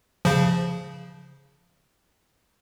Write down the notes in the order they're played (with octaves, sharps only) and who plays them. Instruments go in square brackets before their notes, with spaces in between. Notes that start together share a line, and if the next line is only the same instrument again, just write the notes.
[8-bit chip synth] C#3 F3